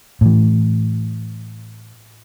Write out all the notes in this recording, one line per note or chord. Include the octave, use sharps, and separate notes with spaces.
A2 E3